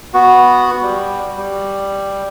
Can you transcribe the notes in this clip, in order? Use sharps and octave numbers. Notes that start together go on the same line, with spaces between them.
B3 F#4
G3
G3